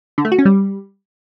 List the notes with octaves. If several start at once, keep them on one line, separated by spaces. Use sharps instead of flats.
D3
A3
F#4
C#4
G3